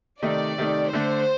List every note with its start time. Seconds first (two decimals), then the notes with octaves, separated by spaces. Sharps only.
0.22 C3 D#3 A3 D#4 D5
0.58 C3 D#3 A3 D#4
0.93 D3 A3 D4 C5